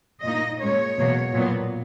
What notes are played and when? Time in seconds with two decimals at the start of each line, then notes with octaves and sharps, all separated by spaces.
0.24 A#2 A#3 D#4 D#5
0.61 A#2 G#3 C#4 C#5
0.97 E2 B2 F#3 A#3
1.33 A#2 F#3 B3